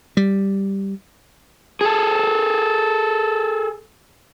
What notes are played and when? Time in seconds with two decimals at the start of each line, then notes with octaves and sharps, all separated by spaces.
0.17 G3
1.81 G#4 A4